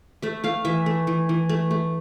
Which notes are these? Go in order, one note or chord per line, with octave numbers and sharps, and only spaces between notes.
A3 E5
A3 F5
E3 E5
A3
E3
E3
A3
A3